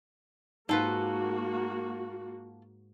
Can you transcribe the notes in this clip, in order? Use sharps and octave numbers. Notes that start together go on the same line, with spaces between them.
G#2 A#3 F4 F#4 A4 B4